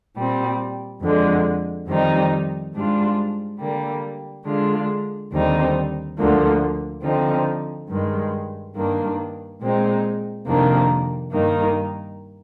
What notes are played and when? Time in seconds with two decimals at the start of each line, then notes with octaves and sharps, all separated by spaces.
0.16 A#2 G3 C4
1.02 F2 D3 G#3
1.88 F2 D#3 G3 C4 D#4
2.74 G#2 G3 D4 F4
3.60 D3 G3 A#3
4.45 D3 G#3 D4 F4
5.32 D#2 D3 G3 C4 D#4
6.17 D2 D3 F3 A#3
7.03 D3 F3 C4 D#4
7.89 G2 D#3 G#3
8.75 G2 D#3 A#3 D4
9.62 A#2 G#3 C4 D#4
10.47 F2 C3 D#3 A#3 D4
11.33 G2 D#3 A#3 D#4